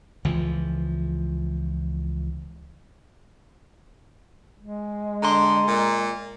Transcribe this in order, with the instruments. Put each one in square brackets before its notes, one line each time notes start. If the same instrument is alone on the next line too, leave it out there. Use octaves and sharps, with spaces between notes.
[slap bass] C#2 E3 F3
[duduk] G#3
[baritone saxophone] D3 [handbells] A#5 C6
[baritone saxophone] A#2